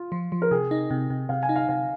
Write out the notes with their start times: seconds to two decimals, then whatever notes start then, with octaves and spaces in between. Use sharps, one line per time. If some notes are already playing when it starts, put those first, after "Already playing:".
Already playing: F4
0.12 F3
0.32 F3
0.42 A#4
0.51 C3 G#4
0.71 D#4
0.90 C3
1.10 C3
1.29 C3 F5
1.43 G#5
1.49 D#4
1.56 F5
1.69 C3 F5